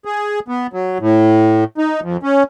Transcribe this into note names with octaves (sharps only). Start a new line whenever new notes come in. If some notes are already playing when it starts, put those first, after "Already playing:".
G#4
B3
F#3
A2
D#4
F2
C#4